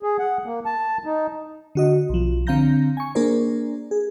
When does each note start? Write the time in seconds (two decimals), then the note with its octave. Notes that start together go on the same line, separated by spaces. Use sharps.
0.03 G#4
0.19 F#5
0.46 A#3
0.66 A5
1.05 D#4
1.75 D3 F#4 D#5
2.10 B1 F3
2.47 D3 C4 F5 A#5 G6 A#6
2.97 G#5 C#6
3.15 A#3 D4 G#4 A#4 C5 D5
3.91 G#4